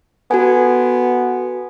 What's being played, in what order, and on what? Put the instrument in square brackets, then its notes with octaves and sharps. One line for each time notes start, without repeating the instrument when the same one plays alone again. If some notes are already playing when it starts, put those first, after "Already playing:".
[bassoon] B3 [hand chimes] F#4 A4 G#5